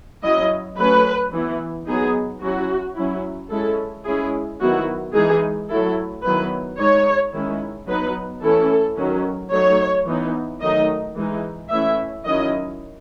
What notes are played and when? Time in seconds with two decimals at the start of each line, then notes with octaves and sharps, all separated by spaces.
0.23 F#3 C#4 E4 D#5
0.78 F#3 A3 C#4 B4
1.32 E3 B3 E4
1.87 F#3 B3 D#4 G#4
2.41 F#3 C#4 E4 F#4
2.96 F#3 C#4 E4
3.51 G#3 C#4 E4 A4
4.05 G#3 C#4 E4 G#4
4.60 D#3 F#3 B3 E4 F#4
5.14 E3 G#3 D#4 G#4
5.69 F#3 A3 E4 A4
6.24 D#3 F#3 B3 E4 B4
6.78 G#3 D#4 C#5
7.33 D#3 G#3 C#4 E4
7.88 F#3 B3 D#4 B4
8.42 E3 A3 C#4 E4 A4
8.97 D#3 F#3 C#4
9.52 F#3 A3 D#4 C#5
10.07 E3 B3 D#4
10.61 D#3 F#3 A3 D#4 D#5
11.16 E3 G#3 D#4
11.70 E3 A3 C#4 E4 E5
12.25 D#3 F#3 C#4 E4 D#5